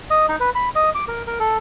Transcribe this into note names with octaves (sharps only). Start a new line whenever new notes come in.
D#5
D#4
B4
B5
D#5
D6
A#4
A#4
A4